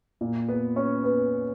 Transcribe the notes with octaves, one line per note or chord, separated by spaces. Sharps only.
A#2
B3 B4
C#4 C#5
B3 B4